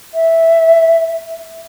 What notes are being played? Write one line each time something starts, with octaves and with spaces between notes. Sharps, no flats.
E5